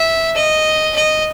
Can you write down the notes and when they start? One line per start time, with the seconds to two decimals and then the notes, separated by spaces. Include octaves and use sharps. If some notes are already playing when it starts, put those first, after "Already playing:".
Already playing: E5
0.36 D#5
0.96 D#5